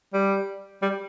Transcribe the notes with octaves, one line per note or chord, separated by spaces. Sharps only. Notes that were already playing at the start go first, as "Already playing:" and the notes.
G3
G3